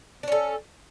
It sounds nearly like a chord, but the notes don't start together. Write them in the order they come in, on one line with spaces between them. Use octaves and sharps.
D4 C#4 A4